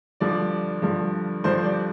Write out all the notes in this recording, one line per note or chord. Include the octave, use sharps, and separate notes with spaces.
G2 D3 F3 D5
G2 D3 F3
G2 D3 F3 C5
D5